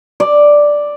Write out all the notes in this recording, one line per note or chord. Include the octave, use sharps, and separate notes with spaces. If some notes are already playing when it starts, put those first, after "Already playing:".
D5